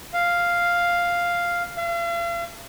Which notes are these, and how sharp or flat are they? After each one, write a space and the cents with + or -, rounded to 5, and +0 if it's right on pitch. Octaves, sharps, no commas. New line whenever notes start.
F5 +0
F5 -40